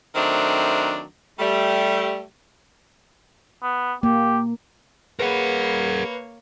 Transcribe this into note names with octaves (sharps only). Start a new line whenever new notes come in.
D#3 F#3 A3 C4 D4
G3 A3
B3
A#3 G4
A#3 G#4 A#4 B4 C#5 F#5